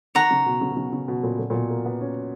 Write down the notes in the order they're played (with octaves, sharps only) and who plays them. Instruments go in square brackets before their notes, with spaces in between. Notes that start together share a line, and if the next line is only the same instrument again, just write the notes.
[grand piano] D#3 [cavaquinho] C#5 F#5 A#5
[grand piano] C#3
B2
C#3
B2
C#3
C#3
B2
A#2
A#2
A#2
B2
A#3
B3
C#4